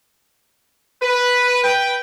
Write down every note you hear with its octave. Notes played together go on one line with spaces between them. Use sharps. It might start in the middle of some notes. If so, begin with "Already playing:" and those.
B4
B4 G5